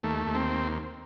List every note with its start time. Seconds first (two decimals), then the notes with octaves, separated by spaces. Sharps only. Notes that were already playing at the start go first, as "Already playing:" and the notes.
0.03 D#2 A3
0.27 D#2
0.35 C4